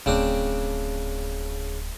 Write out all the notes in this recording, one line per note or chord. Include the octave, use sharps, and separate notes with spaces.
D1 C#3 C4 D4